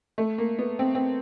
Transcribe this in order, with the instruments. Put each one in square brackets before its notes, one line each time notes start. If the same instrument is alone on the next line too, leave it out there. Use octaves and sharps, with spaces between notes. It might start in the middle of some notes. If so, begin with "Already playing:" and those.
[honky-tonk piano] A3
A#3
B3
C4
C4